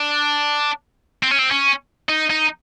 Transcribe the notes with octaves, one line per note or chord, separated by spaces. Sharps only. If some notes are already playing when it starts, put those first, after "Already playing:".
Already playing: D4
C4
C#4
C4
C#4
D#4
D#4